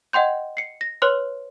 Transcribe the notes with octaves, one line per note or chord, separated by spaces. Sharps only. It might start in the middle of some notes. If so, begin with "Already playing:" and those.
D#5 F#5 G5 C6 G6
C7 C#7
A#6
B4 C#5 C6 F6 F#6